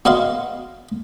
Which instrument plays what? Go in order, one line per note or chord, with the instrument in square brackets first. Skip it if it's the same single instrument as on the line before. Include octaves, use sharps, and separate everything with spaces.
[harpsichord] F#4 B4 C#5 D#5 F5 C6